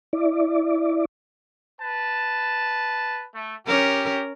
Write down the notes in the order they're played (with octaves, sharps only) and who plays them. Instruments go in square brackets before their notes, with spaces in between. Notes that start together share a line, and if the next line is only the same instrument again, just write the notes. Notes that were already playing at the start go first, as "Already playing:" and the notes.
[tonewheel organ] E4 D5
[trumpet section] B4 A5
A3
[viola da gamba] C#4 A#4 [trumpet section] G4